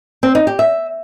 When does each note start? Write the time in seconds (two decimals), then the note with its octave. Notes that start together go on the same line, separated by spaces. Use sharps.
0.23 C4
0.35 D#4
0.47 G4
0.59 E5